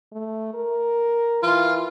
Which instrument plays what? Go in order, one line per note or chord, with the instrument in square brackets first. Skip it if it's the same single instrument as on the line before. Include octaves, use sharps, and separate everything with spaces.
[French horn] A3
A#4
[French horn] E3 [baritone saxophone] F4